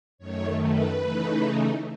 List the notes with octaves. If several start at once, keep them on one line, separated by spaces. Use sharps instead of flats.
F#2 D#3 A3 C#5
B4
C#3 E3 A3 D#4